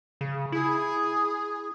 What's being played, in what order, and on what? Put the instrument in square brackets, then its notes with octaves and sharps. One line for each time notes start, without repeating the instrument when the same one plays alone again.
[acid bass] C#3
[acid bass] E4 [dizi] G#4